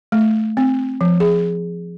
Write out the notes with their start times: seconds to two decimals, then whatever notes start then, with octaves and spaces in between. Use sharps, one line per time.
0.12 A3
0.57 C4
1.01 F3
1.20 G#4